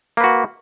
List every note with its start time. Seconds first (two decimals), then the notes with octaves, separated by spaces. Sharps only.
0.17 A#3
0.20 B4
0.24 F#4